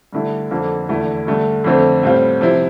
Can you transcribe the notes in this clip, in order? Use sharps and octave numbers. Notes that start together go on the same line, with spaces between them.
G2 D3 A3 E4
F2 D3 F3 A#3
E2 D3 A3 E4
G2 D3 A3
F2 D3 A3 C4
A2 G3 C4 F4
C3 F3 C4 E4